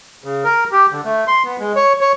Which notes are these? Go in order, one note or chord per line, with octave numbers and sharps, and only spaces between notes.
C#3
A#4
G4
D3
A3
C6
B3
G#3
C#5
C#5